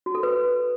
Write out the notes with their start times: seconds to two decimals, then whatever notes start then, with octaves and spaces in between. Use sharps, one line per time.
0.06 F#4
0.15 A4
0.23 B4